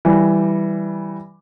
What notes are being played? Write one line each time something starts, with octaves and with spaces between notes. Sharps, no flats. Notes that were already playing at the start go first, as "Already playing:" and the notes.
E3 G3